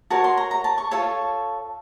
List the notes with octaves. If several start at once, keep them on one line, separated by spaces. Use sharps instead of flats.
F#4 A#4 C#5 A5
C6
A#5
A#5
A5
C#6
F4 A4 C#5 A5